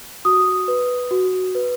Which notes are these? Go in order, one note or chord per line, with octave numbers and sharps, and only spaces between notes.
F#4 D#6
B4
F#4
B4